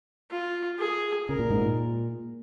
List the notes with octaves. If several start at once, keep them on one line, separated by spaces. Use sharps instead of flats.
F4
G#4
C#3 A#4
A#2
G#2
A#2